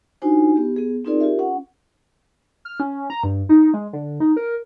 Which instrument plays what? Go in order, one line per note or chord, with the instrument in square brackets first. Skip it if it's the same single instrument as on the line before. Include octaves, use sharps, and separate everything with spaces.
[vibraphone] D4 D#4 F4 F#4 C5 G#5
B3 G4
B3 G#4
C4 D#4 F4 G#4 A#4 D5
F4 G4 A#4 E5
C#4 F#5
[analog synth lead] F6
C#4
A#5
G2
D#4
G#3
D3
D#4
A#4